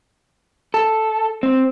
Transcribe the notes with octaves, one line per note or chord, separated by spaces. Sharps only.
A4
C4